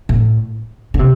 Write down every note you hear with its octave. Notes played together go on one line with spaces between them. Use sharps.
A2
D3
C3